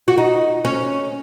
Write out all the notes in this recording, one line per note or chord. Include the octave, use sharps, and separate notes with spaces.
F#4
D#4
C#4